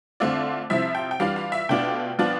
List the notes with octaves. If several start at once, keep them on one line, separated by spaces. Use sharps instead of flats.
D3 A3 C4 F4 D5
C3 F3 C4 E4 E5
G5
G5
E3 G3 D4 F4 F5
F5
E5
B2 A3 D4 F4 G5
F3 B3 D4 F4